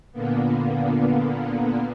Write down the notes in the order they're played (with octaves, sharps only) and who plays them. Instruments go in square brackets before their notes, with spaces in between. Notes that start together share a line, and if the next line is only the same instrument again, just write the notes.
[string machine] A#2 D3 A#3 B3